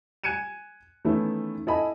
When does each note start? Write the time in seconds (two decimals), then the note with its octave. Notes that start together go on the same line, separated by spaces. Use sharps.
0.24 G#5 F#6 G#6 C#7 D#7 E7
1.05 D#3 E3 A3 B3 C#4 E4
1.67 E4 A4 D#5 G#5 B5